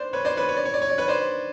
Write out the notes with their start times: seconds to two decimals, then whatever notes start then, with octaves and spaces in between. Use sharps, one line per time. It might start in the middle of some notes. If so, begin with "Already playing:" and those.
Already playing: B4 C5 D5
0.13 B4 C#5
0.25 C5 D5
0.37 B4 C#5
0.49 C#5
0.57 D5
0.65 C#5
0.74 D5
0.82 C#5
0.90 D5
0.98 B4 C#5
1.08 C5 D5